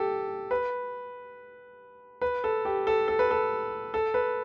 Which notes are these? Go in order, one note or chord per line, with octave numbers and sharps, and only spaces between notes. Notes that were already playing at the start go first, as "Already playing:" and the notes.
Already playing: G4 A4
B4
B4
A4
G4
A4
A4
B4
A4
A4
B4